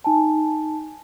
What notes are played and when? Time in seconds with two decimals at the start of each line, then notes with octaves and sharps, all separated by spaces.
0.04 D#4 G#5 A5